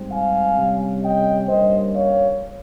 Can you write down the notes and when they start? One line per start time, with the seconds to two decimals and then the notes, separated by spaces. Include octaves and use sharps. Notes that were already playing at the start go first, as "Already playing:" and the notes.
Already playing: G#2 G3 C4
0.11 F5 G#5
0.57 C3 G3 C#4
1.02 D#5 G5
1.48 G2 G3 A#3 C#4 C5 D#5
1.93 C#5 F5